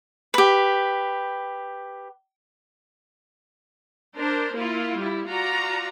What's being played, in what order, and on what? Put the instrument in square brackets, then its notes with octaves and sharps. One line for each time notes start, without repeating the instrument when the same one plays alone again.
[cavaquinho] G4 B4
[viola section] D4 A#4 C5
A#3 E4 F4
G3 E4
F4 F#4 D5 A#5